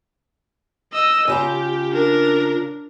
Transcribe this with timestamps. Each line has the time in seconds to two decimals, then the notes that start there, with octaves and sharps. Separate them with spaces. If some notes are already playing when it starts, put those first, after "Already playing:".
0.93 D#5 E6
1.28 C#3 F4 G4 A#5
1.94 D4 A#4